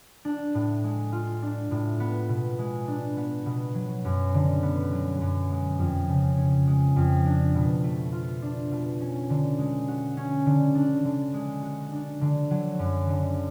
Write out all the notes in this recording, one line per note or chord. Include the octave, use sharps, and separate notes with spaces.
D4
A2
G#3
F4
D4
A2
B3
B2
G#3
D4
B3
B2
F#3
F#2
D3
B3
F#3
F#2
G#3
F2
C#3
C#4
G#3
F2
D4
B2
A3
F4
D4
B2
C#4
D3
G#3
F#4
C#4
D3
D4
D3
G#3
F#4
D4
D3
F#3
F#2
D3